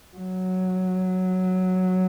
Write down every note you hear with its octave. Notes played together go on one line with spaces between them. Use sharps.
F#3